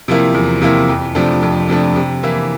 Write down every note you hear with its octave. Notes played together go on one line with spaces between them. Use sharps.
C3 F3 A#3 E4
E2
C3 F3 A#3 E4
F2
C3 F3 A3 D4
F2
C3 F3 A3 D4
C3
E3 A#3 E4